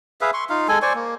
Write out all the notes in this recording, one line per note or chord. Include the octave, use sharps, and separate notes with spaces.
G#4 B4 E5 F5
C6 C#6
D#4 F4 F5
G#3 A4 G#5
C5 D5 G#5 C#6
A#3